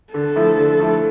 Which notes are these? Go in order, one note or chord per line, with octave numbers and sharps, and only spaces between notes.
D3 A4
F3 A3 E4
D3
F3 A3 E4